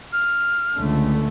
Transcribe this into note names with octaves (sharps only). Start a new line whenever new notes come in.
F6
C#2 D3 A3